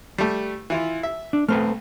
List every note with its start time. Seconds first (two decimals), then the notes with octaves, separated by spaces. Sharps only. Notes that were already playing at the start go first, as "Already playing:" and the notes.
0.18 G3 A3
0.70 E3 E4 F4
1.03 E5
1.33 D4
1.49 B1 A3 C4 B4 F6